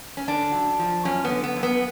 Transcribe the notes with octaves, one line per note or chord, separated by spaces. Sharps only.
C#4
D3 D4
F#2
F3
F#2 C#4
B3
D3
B3
F#2
B3